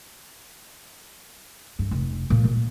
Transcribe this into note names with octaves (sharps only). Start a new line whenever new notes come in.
G2
F1
A#2
D#3 A#3